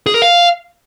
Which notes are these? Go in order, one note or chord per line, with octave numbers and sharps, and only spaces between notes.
G#4
A#4
F5